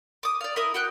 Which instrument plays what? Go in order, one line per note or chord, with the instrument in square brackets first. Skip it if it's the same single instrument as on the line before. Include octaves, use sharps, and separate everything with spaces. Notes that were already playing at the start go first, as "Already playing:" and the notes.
[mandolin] D6 D#6
D5 F5
E4 A#4 D#6
F#4 G5 F#6